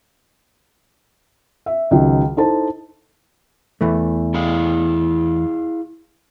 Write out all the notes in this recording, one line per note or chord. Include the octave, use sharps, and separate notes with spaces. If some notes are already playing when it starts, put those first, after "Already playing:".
E5
C#2 D#3 F#3
D#4 E4 A4 C5 A5
E2 E3 A3
E4 G#4 F5